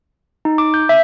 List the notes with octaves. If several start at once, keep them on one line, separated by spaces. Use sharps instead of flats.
D#4
D6
G6
E5